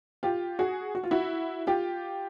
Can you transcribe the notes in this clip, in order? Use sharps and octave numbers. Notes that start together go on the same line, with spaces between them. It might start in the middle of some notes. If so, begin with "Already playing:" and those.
F4 G4
F#4 G#4
F#4
F4
E4 F#4
F4 G4